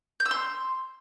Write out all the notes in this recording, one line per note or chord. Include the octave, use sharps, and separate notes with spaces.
G6
E6
C6